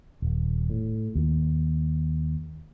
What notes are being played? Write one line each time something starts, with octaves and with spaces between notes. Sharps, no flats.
D#1
A2
D#2